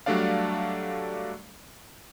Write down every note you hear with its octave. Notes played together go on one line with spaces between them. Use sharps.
F#3 G3 A3 D4 D5 F5